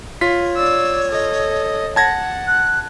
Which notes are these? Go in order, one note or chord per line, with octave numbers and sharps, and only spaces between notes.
F4 C#5 B6
D5 E6
A4 D#5
F#5 A5 G#6 A#6
F#6